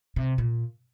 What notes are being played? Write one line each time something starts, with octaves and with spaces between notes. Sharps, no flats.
C3
A#2